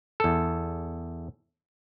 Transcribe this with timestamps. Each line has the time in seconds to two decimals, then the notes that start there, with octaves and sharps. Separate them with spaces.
0.20 E2 A4